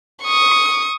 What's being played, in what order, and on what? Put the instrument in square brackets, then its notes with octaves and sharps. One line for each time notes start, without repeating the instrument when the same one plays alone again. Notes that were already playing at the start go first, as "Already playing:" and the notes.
[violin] C#6 D#6